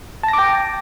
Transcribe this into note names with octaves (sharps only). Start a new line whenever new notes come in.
G5 A5 D6 A#6